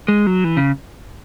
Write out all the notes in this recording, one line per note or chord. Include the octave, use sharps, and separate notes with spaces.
G#3
F#3
E3
C#3